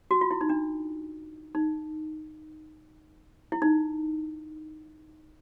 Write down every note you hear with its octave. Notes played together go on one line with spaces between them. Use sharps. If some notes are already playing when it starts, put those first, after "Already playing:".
F#4
F4
E4
D#4
D4
D#4
E4
D#4